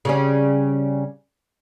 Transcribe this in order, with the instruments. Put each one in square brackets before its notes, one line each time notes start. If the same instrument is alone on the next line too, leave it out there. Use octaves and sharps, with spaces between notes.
[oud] C#3 G3 C#4